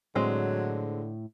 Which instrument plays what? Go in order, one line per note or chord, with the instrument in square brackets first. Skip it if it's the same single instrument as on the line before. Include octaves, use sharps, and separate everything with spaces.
[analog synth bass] A2 [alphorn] D3 [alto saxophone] F#3 [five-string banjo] G#3 C4